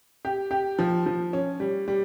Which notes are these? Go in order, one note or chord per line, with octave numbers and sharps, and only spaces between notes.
G4
G4
F3
F3
C#4
G3
G3